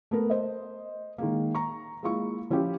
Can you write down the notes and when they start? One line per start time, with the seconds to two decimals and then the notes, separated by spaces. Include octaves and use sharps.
0.11 A3 B3 A#4
0.30 C5 D#5
1.18 D#3 G#3 A#3
1.55 A#5 C#6
2.03 G#3 A#3 E4 F4 C#6
2.50 F3 C#4 E4 F4 G4